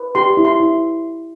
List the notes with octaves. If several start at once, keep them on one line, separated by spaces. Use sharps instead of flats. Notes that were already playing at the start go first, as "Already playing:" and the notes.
Already playing: B4
G4 C6
E4
C6
E4